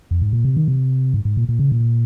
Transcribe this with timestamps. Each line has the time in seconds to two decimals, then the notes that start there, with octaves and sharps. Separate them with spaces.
0.11 F2
0.21 G#2
0.33 A#2
0.45 C3
0.57 D#3
0.68 C3
1.14 G#2
1.25 G#2
1.37 A#2
1.49 A#2
1.59 C#3
1.72 A#2